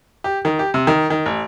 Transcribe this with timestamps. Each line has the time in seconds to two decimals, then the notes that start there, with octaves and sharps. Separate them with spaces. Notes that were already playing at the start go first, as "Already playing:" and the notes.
0.24 G4
0.45 D#3
0.59 G4
0.74 C3
0.87 D#3
1.10 D#3
1.26 A1